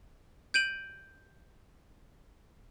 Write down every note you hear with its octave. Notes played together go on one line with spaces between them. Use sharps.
G6 D7 D#7 F#7